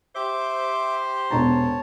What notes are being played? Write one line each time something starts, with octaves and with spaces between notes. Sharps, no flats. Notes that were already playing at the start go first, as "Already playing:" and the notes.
G4 C5 E5 D6
E1 B3 C#5 A5 A#5